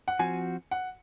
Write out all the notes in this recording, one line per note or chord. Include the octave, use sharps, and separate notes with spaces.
F#5
F3 C4 F#4 G#5
F#5